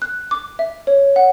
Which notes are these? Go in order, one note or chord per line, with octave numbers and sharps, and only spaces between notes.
F#6
D6
E5
C#5
F#5